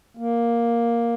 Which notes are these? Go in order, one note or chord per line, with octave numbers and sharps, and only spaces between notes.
A#3